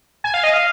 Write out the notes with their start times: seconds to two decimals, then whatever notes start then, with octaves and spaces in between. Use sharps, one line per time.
0.24 G#5
0.34 F5
0.44 D#5
0.54 F5